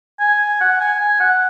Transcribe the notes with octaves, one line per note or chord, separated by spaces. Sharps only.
G#5
F#5
G#5
G#5
F#5